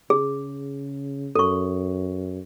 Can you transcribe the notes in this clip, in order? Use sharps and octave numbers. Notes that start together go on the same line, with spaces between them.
C#3 G#4
F#2 A4 C#6